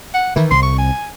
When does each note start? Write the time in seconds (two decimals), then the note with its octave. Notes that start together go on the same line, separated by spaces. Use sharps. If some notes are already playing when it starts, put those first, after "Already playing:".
0.14 F#5
0.36 D#3 E3 E4
0.51 C2 C6
0.63 C#6
0.79 G#5